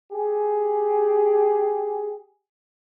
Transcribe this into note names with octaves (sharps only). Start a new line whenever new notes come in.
G4 G#4